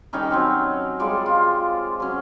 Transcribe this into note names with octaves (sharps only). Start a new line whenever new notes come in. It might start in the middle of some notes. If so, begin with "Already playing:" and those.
D#3 G3 C#4 D#4
F#3 C4 C#4
G3 G#3 F4 D5
F4
F#3 C#4